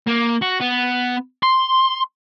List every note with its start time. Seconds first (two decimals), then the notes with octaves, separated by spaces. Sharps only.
0.08 A#3
0.42 F#4
0.60 B3
1.43 C6